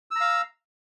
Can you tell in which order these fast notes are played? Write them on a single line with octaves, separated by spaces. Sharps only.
E6 A#5 F5